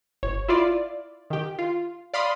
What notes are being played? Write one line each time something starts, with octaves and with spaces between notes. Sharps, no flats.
G1 C#5
E4 F4 D5
D#3 G4
F4
D5 F5 B5 C6 D#6